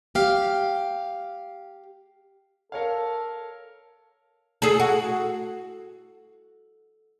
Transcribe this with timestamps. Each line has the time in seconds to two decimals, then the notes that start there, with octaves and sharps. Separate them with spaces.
0.15 G4 F5
2.72 A4 A#4 C#5 F5
4.62 G#4 A4
4.80 F#4